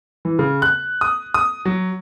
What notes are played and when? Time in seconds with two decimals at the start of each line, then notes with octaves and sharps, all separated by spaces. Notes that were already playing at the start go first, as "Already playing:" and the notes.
0.25 E3
0.39 C#3
0.62 F#6
1.01 D#6
1.34 D#6
1.65 F#3